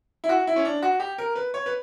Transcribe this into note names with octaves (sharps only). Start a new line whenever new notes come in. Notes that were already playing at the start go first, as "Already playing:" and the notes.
E4
F#4
E4
C#4
D4
F#4
G4
A#4
B4
C#5
B4